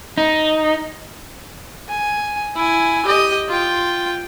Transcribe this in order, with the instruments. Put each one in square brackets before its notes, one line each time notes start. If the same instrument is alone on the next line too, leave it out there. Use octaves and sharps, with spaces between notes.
[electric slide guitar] D#4
[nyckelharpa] G#5
E4 G#5
G4 D#5
F4 G5